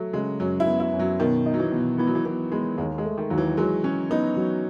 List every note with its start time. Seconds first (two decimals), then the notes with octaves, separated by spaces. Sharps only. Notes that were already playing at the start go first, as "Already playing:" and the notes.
Already playing: F#3 A3
0.13 C#3 G#3
0.39 F#2 F#3
0.60 E4
0.66 B3
0.80 E4
0.93 F#2
1.00 F#3
1.20 B2 D#3
1.46 D#4
1.54 F#3
1.59 E3
1.72 B2
1.98 E3 B3
2.07 F#3
2.15 E3
2.25 E3 B3
2.52 G#3 B3
2.78 D#2 G#3
2.98 G#3
3.05 A3
3.18 D#3
3.30 D#2 F#3
3.38 E3
3.57 F#3 G#3
3.84 G#3 C#4
4.10 B3 D#4
4.37 F#3